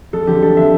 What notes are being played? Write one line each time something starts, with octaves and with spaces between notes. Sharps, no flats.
F2 A4
D3 F3 G4
F2 A4
D3 F3 E5